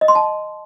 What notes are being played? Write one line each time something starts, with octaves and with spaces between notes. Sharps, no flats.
D#5
C6
A5